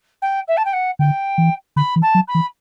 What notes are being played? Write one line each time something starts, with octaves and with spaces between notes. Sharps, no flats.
G5
E5
A5
G5
F#5
D3 G5
E3
D3 B5
E3
A5
F#3
B5
E3